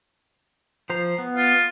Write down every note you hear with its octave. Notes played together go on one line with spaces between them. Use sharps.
F3 C5 A#5
B3
F4